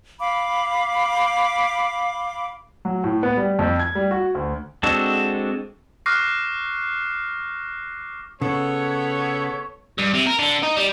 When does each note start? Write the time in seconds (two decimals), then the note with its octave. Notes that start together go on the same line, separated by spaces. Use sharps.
0.19 F5 B5 D6
2.85 F#3
3.04 A2
3.23 B3
3.37 G3
3.59 F2
3.79 G#6
3.95 G3
4.11 F#4
4.35 D2
4.83 G#3 C4 D4 F#4 A4
6.06 C#6 D6 F6 F#6 A#6 C7
8.41 C#3 B3 A4 C#5
9.98 G2
10.14 C3
10.27 A#4
10.39 D3
10.63 D#4
10.76 G3